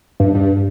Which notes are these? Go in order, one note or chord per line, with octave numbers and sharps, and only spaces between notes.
G2
G2